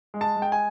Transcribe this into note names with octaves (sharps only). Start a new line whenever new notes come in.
G#3
A5
G#3
G5
G#5